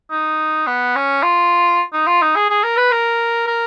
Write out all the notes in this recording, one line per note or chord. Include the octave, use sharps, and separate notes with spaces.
D#4
B3
C#4
F4
D#4
F4
D#4
G#4
G#4
A#4
B4
A#4
A#4